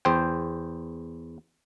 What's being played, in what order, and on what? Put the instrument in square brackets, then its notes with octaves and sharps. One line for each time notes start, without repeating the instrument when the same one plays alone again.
[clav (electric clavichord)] E2 C5 G5